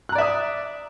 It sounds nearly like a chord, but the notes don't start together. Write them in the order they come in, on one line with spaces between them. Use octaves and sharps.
F#6 A#5 D5 E5 D#6